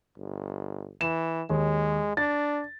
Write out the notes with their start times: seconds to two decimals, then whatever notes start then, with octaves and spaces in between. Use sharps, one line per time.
0.18 G1
1.01 E3 E7
1.50 D#2 G#3
2.17 D4 A6